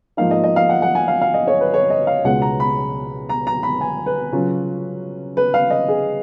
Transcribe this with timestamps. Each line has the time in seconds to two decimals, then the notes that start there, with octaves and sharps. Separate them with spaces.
0.17 G#2 F3 A#3 D#4 F5
0.31 D#5
0.44 D#5
0.56 F5
0.69 F#5
0.82 F#5
0.95 G#5
1.08 F5
1.21 F5
1.34 D#5
1.48 C#5
1.61 B4
1.74 C#5
1.90 D#5
2.07 F5
2.25 C#2 B2 G#3 F#5
2.42 A#5
2.60 B5
3.29 A#5
3.47 A#5
3.63 B5
3.81 G#5
4.06 B4
4.32 C#3 F#3 C#4 F4
5.37 B4
5.54 F5
5.70 D#5
5.88 G#4